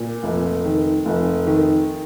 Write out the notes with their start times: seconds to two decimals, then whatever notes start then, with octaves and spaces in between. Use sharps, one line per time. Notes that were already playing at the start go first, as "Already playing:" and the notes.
Already playing: A#2
0.23 F1
0.65 D#3
1.05 F1
1.47 D#3